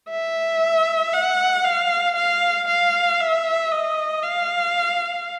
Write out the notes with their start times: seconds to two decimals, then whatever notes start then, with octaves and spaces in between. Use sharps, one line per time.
0.10 E5
1.13 F#5
1.64 F5
2.16 F5
2.68 F5
3.20 E5
3.71 D#5
4.23 F5